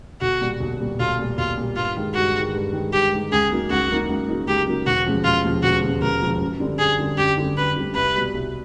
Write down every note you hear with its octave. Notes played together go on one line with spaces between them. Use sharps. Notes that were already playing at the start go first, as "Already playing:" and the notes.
B1 F#4
A#2 G3
B1
A#2 G3
B1 F4
A#2 G3
B1 F4
A#2 G3
G2 F4
D#3 G#3
G2 F#4
D#3 G#3
G2
D#3 G#3
G2 G4
D#3 G#3
C#2 G#4
C#3 F#3 A#3 D#4
C#2 F#4
C#3 F#3 A#3 D#4
C#2
C#3 F#3 A#3 D#4
C#2 G4
C#3 F#3 A#3 D#4
E1 F#4
D#2 C#3 F3 G#3
E1 F4
D#2 C#3 F3 G#3
E1 F#4
D#2 C#3 F3 G#3
E1 A#4
D#2 C#3 F3 G#3
F#2
D3 G3 C4
F#2 G#4
D3 G3 C4
F#2 G4
D3 G3 C4
F#2 B4
D3 G3 C4
C2 B4
B2 G3
C2